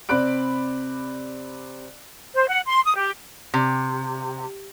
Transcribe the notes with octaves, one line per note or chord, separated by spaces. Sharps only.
C3 C4 D5 B5 F#6 D7
C5
F#5
C6
D#6
G4
C3